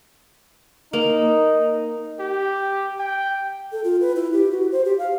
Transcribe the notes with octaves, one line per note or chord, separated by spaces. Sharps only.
A#3 D#4
G4
G5
A4
F4
B4
E4
G4
F#4
C5
G4
F5